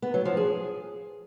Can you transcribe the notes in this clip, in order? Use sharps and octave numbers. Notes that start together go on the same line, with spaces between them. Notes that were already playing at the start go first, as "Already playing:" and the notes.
B3
F#3
F3
G#4